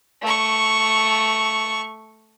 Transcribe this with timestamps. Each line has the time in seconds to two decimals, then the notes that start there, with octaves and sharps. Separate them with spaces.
0.22 A3 C#6